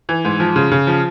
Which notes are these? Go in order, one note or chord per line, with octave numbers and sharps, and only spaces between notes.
E3
G#2
F3
C#3
C#3
F3